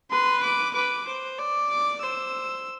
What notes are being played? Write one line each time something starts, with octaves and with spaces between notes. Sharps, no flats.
B4 C6
D6
B4 D6
C5
D5
D6
C5 E6